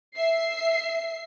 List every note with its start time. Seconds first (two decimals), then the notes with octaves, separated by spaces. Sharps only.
0.17 E5 C7